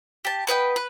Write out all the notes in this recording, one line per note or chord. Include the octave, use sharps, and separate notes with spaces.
G4 A5
B3 B4 D#5 G5
B4